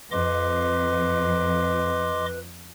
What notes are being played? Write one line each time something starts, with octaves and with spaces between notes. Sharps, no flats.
F2 B4 D#5 C6 D6